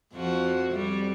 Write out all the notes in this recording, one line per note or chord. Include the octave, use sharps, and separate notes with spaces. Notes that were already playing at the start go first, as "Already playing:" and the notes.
F2 F3 F#4
F2 G3